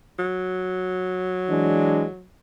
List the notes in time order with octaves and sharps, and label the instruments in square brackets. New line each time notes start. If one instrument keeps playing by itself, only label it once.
[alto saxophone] F#3
[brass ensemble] E3 G#3 D4